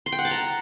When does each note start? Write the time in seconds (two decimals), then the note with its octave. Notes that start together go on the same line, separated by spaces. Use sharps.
0.06 C6
0.12 G5
0.19 F#5
0.25 A5
0.31 A#5